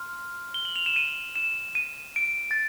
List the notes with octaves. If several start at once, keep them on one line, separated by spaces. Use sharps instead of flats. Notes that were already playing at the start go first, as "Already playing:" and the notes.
Already playing: C6 F6
G7
F#7
F7
E7
D#7
E7
D#7
D7
A6